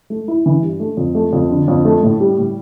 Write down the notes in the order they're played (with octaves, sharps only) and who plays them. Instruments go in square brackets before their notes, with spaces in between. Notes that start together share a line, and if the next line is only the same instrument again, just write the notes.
[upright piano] A3
E4
E3
G2
A3
F2
A3
F2
D3
F2
A3
A2
G3
A2